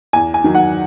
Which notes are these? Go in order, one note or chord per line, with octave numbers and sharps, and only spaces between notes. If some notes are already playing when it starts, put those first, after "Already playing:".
E2 G#5
G#5
D#3 F#3
F#5